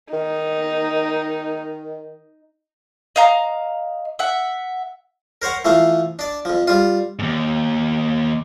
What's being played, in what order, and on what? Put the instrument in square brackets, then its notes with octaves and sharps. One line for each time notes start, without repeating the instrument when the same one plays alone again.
[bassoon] D#3 [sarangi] D#4
[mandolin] D#5 F5 A#5
E5 F#5
[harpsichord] A#4 C5 C#5 F#5
E3 F3 A3 F5
D4 D5
F2 F3
G3 F4
[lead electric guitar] D#2 G#2